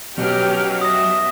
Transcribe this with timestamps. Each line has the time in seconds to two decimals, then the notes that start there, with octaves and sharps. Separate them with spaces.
0.18 B2 F#3 B3 C#4 G4 F6
0.81 E5 D#6 A#6